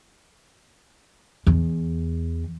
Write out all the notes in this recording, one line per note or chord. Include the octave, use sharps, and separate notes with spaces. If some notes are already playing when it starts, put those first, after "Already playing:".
E2